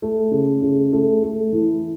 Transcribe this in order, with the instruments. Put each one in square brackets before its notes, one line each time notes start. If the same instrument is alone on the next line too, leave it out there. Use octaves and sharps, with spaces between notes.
[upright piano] A3
C#3
C#3
A3
A3
E3